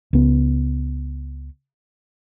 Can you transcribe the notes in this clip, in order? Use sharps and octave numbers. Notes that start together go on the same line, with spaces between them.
C#2 B3